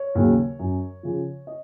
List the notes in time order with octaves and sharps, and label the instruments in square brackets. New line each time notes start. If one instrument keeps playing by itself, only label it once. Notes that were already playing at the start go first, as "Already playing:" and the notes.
Already playing: [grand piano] C#5
D#2 C#3 F#3
F#2
C#3 F3
D#5